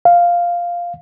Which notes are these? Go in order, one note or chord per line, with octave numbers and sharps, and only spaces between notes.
F5